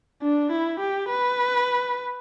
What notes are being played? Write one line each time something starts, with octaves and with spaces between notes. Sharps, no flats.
D4
E4
G4
B4